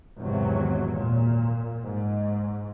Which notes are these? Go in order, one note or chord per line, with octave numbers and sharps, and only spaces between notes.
G#1 E2 C3 F#3
A#2
G#2